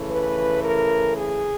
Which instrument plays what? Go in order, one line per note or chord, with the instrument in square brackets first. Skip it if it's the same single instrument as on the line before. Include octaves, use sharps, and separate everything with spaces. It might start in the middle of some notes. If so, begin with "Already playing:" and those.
Already playing: [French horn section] C#3 E3 A3
B4
A#4
G#4